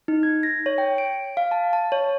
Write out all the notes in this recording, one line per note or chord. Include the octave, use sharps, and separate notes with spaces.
D#4
G#6
A#6
C#5
G5
D7
F5
A5
A5
C#5